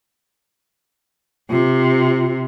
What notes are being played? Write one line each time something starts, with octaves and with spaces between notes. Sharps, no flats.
C3 F4